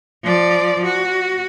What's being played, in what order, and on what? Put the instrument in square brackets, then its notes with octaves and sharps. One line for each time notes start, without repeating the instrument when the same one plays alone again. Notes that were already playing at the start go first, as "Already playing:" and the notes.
[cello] F3 D5
F#4